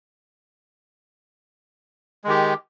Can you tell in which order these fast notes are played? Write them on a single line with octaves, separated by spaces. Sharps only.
G#3 D#3 G4